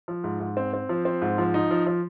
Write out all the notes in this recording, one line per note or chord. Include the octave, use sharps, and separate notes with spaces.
F3
G#2
G#2
C4
C4
F3
C4
G#2
F3
D#4
F3
F3